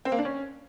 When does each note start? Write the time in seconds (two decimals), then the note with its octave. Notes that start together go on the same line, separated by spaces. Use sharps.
0.05 C4
0.12 A#3
0.18 D4
0.25 C#4